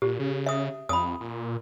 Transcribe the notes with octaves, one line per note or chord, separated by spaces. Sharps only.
A#2 G4
C#3
E5 D#6
F2 B5 D#6
A#2